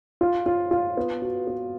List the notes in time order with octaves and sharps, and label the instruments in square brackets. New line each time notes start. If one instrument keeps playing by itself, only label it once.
[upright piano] F4
F4
F4
B3
F#4
B3